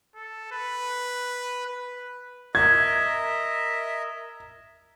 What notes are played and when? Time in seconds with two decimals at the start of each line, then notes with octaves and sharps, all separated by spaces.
0.15 A4
0.52 B4
1.67 B4
2.55 A#4 D#5 E5 G#6